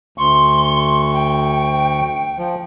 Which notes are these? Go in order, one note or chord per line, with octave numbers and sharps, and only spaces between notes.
D2 C6 C#6
G5
F3